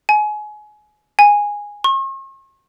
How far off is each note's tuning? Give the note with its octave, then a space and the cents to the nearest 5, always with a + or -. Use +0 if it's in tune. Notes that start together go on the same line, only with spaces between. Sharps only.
G#5 +25
G#5 -10
C#6 -45